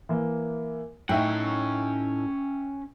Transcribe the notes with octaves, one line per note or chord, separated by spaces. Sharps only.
E3 A#3
A2 C#4 D#4 E5 F#5 G5